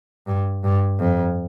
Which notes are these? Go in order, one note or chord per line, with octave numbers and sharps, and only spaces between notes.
G2
G2
F2